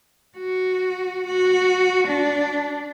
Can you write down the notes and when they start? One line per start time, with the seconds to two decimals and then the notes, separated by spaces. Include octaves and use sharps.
0.38 F#4
1.27 F#4
2.08 D4